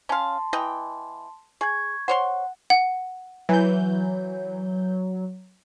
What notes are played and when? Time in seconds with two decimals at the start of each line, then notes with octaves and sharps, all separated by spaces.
0.09 C#4 F5 A5 C6
0.53 E3 D#5 G5
1.61 G#4 C#6 G#6
2.08 C5 C#5 F#5 C6
2.70 F#5
3.49 E3 F#3 G6